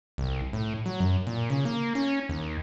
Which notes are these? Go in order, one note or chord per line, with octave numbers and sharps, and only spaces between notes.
C2
A2
F#3
F#2
A#2
C#3
A#3
C#4
D#2